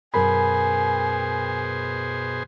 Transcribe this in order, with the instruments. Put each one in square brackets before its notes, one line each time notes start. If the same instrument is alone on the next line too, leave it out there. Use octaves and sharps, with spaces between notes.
[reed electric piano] F#2 A#4 B5 [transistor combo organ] B2 G#4 C5 [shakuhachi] G#5